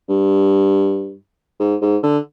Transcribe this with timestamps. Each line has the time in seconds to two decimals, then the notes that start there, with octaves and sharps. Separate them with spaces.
0.09 G2
1.60 G#2
1.82 G#2
2.03 D3